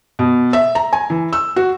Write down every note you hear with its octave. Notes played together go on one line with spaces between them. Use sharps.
B2
E5
A#5
G#5
E3
E6
F#4